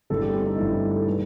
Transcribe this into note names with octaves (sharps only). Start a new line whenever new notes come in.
G1 G2 E3 A3 A4
G4
C4
D#4
G1 G2 E3 A3 E4
A4
D#3 G3 B4